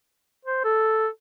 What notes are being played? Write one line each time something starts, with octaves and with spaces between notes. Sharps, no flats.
C5
A4